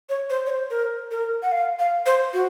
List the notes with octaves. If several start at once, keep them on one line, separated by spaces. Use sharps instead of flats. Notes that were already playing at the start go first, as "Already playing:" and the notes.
C#5
C5
C#5
C5
A#4
A#4
F#5
F5
F5
C5
F#4